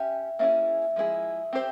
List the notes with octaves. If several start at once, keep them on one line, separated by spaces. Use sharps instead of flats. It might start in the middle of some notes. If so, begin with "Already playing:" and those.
Already playing: C#4 G4 E5
A#3 C#4 E4 G#4 E5
F3 G#3 C4 E4 G#4
C4 G4 C5